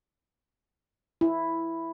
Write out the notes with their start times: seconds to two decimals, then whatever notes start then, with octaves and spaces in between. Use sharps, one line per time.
1.21 E4